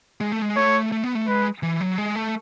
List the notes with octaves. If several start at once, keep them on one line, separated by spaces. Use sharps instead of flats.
G#3
A3
G#3
A3 C#5
A3
B3
A3
G#3 B4
E3
F#3
G#3
A3